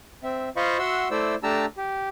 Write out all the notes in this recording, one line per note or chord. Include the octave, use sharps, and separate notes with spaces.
C4 E5
F4 C5 D#5 F5 B5 C#6
F#4 E5 F#5 C6 E6
A3 E4 C5 D5 E6
A3 D4 G4 A5 A#5 E6
G4